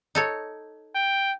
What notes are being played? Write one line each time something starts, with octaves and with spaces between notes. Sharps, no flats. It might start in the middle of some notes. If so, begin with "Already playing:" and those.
D#4 A4 C#5
G5